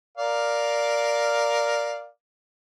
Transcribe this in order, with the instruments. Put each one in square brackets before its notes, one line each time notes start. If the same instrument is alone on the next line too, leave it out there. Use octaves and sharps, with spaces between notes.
[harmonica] A#4 D5 F5